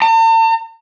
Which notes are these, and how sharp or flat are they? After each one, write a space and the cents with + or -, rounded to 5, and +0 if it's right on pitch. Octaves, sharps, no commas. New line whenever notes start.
A5 +45